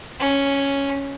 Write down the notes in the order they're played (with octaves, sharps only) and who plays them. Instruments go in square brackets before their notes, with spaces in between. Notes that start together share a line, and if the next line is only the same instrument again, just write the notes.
[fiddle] C#4